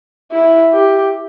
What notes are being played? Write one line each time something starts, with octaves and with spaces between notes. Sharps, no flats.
E4
G4